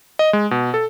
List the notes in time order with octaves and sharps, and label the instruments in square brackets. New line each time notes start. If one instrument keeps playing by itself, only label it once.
[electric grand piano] D#5
G#3
B2
A4